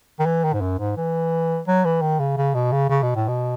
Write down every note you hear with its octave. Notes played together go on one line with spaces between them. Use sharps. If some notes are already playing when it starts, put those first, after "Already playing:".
D#3
E3
D#3
G#2
F#2
G#2
E3
F#3
E3
D#3
C#3
C#3
B2
C#3
C#3
B2
A2
B2